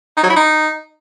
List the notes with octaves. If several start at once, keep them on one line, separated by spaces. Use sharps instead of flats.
D#4
F#3
E4
D#4